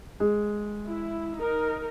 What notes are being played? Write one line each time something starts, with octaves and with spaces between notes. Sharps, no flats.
G#3
E4
D#4 A#4